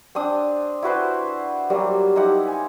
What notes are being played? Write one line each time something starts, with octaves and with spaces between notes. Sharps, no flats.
C4 D4 D#6
E4 F#4 B4 C5
F#3 G3 A#3 C4
D#4 E4 G4 F#5
G#5